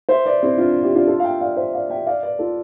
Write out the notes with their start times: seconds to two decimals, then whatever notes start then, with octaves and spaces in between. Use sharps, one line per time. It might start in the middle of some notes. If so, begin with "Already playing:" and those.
0.09 C5 E5
0.26 B4 D5
0.43 C4 E4
0.58 D4 F4
0.83 E4 G4
0.95 D4 F4
1.07 F4 A4
1.20 F5
1.24 E5 G5
1.40 D5 F5
1.56 C5 E5
1.74 D5 F5
1.90 E5 G5
2.07 D5 F5
2.23 B4 D5
2.39 F4 A4